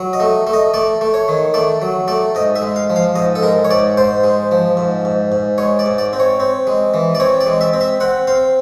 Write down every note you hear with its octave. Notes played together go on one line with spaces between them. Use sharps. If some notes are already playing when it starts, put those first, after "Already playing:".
Already playing: F#3
D#5
A3
A3
D#5
A3 D5
A3
C#5
D#3
A3 D5
F#3
A3 D5
G#2 D#5
E5
G#3
F5
F3
F5
G#2 D#5
A4
G#3 A#4
C#5
G#2 D5
G#2 C5
G#3
F3
G#2
G#2
G#2
G#3 C#5
D5
G#2
D5
C4
C#5
C4
G#3
E3
D5
C4 C#5
D5
G#3
E5
C4
E5
C4 F#5
C4 F5